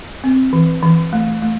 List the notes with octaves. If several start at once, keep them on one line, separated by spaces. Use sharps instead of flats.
C4
E3
E3
A3
A3